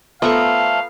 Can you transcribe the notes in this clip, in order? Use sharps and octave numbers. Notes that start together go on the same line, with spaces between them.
F3 A3 B3 F4 A4 F5 A#5 C#6